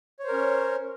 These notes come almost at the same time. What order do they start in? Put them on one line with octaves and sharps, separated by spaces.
C#5 C5 A#4 C#4